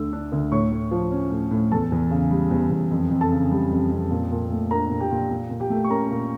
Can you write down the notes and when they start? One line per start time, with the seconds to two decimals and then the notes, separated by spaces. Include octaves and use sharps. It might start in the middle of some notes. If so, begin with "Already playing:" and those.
Already playing: D2 D3 A3 E6
0.13 D4
0.32 D2
0.51 A2 C#5 C#6
0.72 A2
0.91 F3
1.11 C#4
1.31 A2
1.51 A2
1.71 E2 A4 A5
1.92 E2
2.11 C#3
2.31 G3
2.51 E2
2.71 E2
2.91 F2
3.11 F2
3.21 A4 A5
3.32 C#3
3.52 G3
3.71 F2
3.91 F2
4.11 A#2
4.31 A#2
4.50 A3
4.70 D4 A#4 A#5
4.90 A#2
5.00 G4 G5
5.10 A#2
5.30 A#2
5.50 A#2
5.60 G4 G5
5.70 A3
5.84 C#6
5.89 C#4 A#4 A#5
6.11 A#2